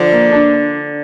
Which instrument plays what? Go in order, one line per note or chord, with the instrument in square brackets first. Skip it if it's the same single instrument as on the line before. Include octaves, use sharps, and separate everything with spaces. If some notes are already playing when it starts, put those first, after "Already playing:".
Already playing: [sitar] D3 [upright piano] F3
[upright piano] A#3
D4